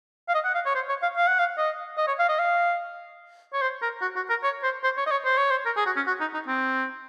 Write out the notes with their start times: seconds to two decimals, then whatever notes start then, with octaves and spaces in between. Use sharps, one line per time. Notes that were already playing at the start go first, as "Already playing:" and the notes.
0.28 F5
0.34 D#5
0.44 F#5
0.54 F5
0.66 C#5
0.75 C5
0.89 C#5
1.02 F5
1.16 F5
1.27 F#5
1.39 F5
1.58 D#5
1.97 D#5
2.07 C#5
2.19 F5
2.28 D#5
2.39 F5
3.53 C#5
3.61 C5
3.82 A#4
4.02 F#4
4.16 F#4
4.29 A#4
4.43 C#5
4.63 C5
4.84 C5
4.97 C#5
5.06 D#5
5.11 C#5
5.25 C5
5.37 C#5
5.51 C5
5.66 A#4
5.76 G#4
5.86 F#4
5.96 C#4
6.07 F#4
6.20 D#4
6.34 D#4
6.47 C4